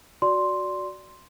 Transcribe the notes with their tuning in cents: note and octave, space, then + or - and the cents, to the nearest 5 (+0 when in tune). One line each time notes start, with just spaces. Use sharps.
F#4 +0 D5 -10 C6 +0